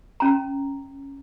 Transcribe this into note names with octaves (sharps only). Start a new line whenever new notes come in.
C#4 A#5